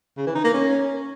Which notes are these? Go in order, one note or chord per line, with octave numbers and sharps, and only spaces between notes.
C#3
E3
D#4
A#3
C#4